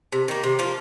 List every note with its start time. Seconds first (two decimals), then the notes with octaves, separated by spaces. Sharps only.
0.12 C3
0.28 D#3 A#3
0.44 C3
0.59 F3 A#3 F4